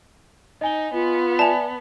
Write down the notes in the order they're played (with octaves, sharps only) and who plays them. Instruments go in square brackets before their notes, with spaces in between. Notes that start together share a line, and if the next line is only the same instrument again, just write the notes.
[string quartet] D#4 [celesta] D#5 G#5 G7
[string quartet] B3 [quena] F4
[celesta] D5 E5 G#5 [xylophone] A5 F7